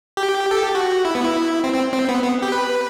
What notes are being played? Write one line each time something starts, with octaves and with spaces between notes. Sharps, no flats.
G4
A4
G4
F#4
E4
B3
E4
C4
C4
C4
B3
B3
G4
B4